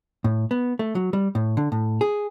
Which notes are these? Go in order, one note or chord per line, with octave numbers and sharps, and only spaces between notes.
A2
B3
A3
F#3
G3
A2
D3
A2
G#4